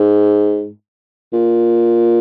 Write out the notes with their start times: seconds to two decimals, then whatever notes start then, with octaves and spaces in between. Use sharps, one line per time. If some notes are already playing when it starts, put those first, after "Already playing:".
Already playing: G#2
1.33 A#2